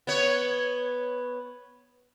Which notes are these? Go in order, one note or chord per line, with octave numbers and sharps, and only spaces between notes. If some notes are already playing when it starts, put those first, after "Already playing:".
B3 C#5